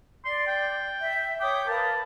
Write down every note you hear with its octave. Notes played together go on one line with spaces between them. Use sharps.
D5 C6
G5
E5
C#5 G5 D6 D#6
A#4 B4 F5 A5